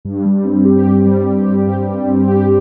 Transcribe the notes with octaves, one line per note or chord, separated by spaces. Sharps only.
G2
G3
C4
G4
G2
G3
C4
G4
G2
G3
C4
G4